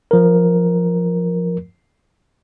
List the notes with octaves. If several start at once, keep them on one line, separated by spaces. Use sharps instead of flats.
F3 A#4